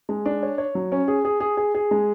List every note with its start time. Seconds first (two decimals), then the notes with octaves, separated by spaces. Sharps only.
0.09 G#3
0.26 D4
0.43 C#5
0.58 C#5
0.75 F#3
0.92 C#4
1.08 G#4
1.25 G#4
1.40 G#4
1.57 G#4
1.75 G#4
1.91 G#3